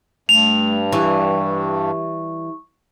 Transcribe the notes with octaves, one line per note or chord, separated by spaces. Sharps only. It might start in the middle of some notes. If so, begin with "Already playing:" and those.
G2 A3 F7
E3 G3 C#6